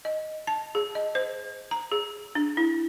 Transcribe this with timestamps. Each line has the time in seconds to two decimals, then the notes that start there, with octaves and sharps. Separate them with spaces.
0.05 D#5
0.47 A5
0.75 G#4
0.95 D#5
1.15 C5
1.71 A#5
1.92 G#4
2.35 D4
2.57 E4